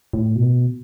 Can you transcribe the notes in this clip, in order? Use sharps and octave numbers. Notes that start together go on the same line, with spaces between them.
A2
B2